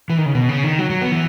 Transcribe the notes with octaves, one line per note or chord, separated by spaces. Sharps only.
E3
D#3
C#3
B2
C#3
D#3
F#3
F#3
B3
E3